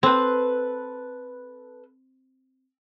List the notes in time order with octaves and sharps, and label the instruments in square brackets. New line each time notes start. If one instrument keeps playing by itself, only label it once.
[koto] C4 [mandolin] A4 B4